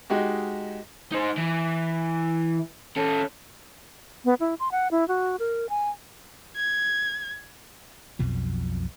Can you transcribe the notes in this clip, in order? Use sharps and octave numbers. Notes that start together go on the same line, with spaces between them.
G#3 D#4 F#4 G4
D#4 C5
E3
C#4 A4
B3
E4
C6
F#5
E4
F#4
A#4
G#5
G#6
B1 F2 B2 F3